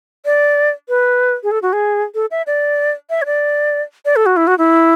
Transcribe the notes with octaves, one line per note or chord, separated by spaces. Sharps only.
D5
B4
G#4
A4
F#4
G#4
A4
E5
D5
E5
C#5
D5
D5
A4
F#4
E4
F#4
E4